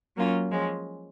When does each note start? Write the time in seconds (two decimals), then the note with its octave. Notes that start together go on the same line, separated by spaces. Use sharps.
0.17 F#3 A#3 C#4 F4
0.51 F3 G#3 C#4